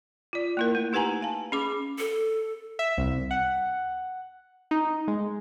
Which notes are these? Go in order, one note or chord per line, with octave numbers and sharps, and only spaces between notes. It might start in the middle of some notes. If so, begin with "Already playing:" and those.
F4 D5
A#3 E4 A#4
A3
D#4 G4 B4 F#5 G#5 A#5
F5 A5
C#4 G#4 B5 D6
A4
E5
C2
F#5
D#4
G#3